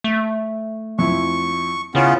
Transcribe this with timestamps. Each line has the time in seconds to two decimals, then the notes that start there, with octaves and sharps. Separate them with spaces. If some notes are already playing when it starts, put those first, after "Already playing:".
0.04 A3
0.99 F2 E4 C#6
1.95 C#3 B3 C#4 E4 F4